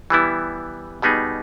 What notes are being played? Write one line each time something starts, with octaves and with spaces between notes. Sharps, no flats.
E3 G3 B3 E4
B2 G3 B3 D#4 G#4